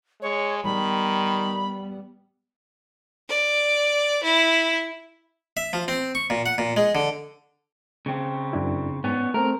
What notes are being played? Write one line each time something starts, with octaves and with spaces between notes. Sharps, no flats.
G#3 C#5
D#3 G3 B3 B5
D5
E4
E5
F3
C4
C#6
A#2
F#5
A#2
G#3
D3
C#3 C4
F#2 D4 E4
G#2 B3 C#4
A3 C4 A#4